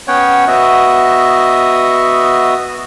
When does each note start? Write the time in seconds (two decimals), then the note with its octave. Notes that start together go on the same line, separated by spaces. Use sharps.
0.08 B3 C#4 C#5 F#5 G5
0.48 B3 F#4 D#5 E5